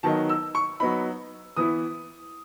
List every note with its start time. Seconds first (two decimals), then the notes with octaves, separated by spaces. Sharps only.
0.03 D#3 F#3 B3 D#4 A5
0.29 E6
0.55 C#6
0.80 F#3 B3 D#4 B5
1.56 E3 B3 E4 D#6